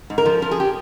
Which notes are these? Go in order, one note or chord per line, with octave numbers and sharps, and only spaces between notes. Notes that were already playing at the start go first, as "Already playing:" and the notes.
G#2
A#4
F3
F3 A#4
G#4
G4